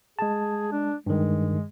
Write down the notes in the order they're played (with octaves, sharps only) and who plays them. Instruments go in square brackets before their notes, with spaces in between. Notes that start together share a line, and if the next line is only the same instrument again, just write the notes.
[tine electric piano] G#3 A5 [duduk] G#4
[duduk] D4
[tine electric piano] G2 D#3 [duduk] G#3